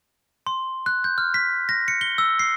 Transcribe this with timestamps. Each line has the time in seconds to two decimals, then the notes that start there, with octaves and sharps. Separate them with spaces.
0.47 C6
0.86 F#6
1.04 G6
1.18 F6
1.34 B6
1.69 A#6
1.88 C#7
2.01 G7
2.18 E6
2.39 C7